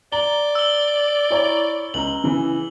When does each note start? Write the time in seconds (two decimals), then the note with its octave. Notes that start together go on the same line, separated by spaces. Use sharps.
0.12 D5 A#5 G7
0.55 E6 G7
1.30 E4 C#5 A#5
1.94 C#2 A#5 F#7
2.24 C#3 E3